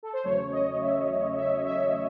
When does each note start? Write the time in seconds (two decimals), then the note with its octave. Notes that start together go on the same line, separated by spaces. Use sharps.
0.03 A4
0.13 C5
0.24 E2 C#3 F#3 A3 C#4 C#5
0.52 D#5
0.81 E5
1.38 E5
1.66 E5